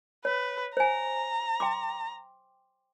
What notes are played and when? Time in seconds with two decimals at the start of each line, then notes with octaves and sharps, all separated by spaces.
0.25 B4 C#5
0.77 C5 G#5 A#5
1.60 G5 C6 D6